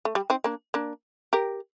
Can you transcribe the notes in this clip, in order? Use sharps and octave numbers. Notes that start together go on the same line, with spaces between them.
A3
G3
C4 D#4
A#3 D4
A#3 D4
G4 A#4